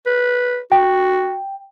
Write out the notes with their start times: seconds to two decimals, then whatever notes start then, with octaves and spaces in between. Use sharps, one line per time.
0.07 B4
0.72 F#4 G5